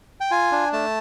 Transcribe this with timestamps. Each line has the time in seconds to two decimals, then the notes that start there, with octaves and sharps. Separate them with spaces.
0.20 G5
0.31 F4 G#5
0.52 D4
0.72 A3 A5